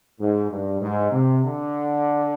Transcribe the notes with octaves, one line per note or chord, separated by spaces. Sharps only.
G#2
G2
G#2
C3
D3